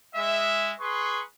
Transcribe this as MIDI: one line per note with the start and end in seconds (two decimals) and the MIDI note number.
0.15 0.71 56
0.15 0.71 76
0.79 1.21 68
0.79 1.21 71
0.79 1.21 84
0.79 1.21 85